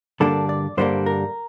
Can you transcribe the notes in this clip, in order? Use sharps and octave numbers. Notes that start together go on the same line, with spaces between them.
G2 D3 G3 A#3 D4 A4
D5
G2 D3 G3 A#3 D4 C5
A#4